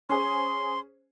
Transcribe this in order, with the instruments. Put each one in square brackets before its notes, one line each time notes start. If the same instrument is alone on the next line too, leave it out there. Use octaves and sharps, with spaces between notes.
[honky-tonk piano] C#4 G#4 C5 [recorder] C6